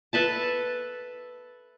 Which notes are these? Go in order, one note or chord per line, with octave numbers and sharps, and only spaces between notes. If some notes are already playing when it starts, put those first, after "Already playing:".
A4 B4 E5 A5